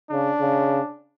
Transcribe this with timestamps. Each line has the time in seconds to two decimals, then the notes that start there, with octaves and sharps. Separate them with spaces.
0.11 C#3 D4
0.40 C#3